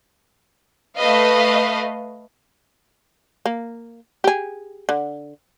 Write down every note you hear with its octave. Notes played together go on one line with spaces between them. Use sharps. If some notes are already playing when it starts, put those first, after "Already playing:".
A3 B4 D#5 F5
A#3
G4 G#4
D3